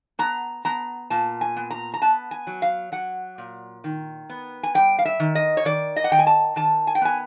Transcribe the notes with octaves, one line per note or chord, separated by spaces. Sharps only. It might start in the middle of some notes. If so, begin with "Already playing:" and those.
B3 A#5
B3 A#5
A#2 A5
G#5
B3
A#5
A#5
B3 A5
G#5
F#3
F5
F#3 F#5
A#2
D#3
B3
G#5
G3 G5
F5
E5
D#3
D#5
C#5
D#3 D5
D#5
F#5
D#3 G5
G#5
A5
D#3 A5
G#5
G5
B3 G#5